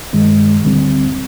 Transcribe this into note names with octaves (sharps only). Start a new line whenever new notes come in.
G2 D#3 G#3
D2 D3 G3 C4